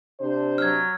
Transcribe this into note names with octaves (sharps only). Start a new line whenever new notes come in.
C3 D4 C5
F#3 F6 G#6